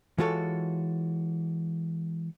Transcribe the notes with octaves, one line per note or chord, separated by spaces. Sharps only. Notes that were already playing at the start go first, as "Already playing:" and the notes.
E3 G#3 F4 F#4 A4 C#5